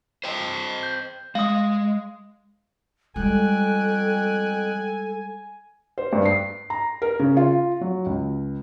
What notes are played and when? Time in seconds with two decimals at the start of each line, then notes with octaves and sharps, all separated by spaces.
0.24 C5 D#5 G5
0.83 G6
1.35 G#3 F5 D#6
3.16 F2 G3 G#3 A4 G5 G#5 F#6
5.98 C5
6.13 G2
6.25 C7
6.70 A#5
7.02 A#4
7.19 C#3
7.37 F4
7.81 F#3
8.06 C#2